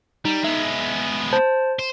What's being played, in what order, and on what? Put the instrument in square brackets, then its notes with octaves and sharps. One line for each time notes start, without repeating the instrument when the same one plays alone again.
[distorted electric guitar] G3 [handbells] D#4
[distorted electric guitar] G#3 B3 [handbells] E5
[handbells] C5 A5
[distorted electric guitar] C5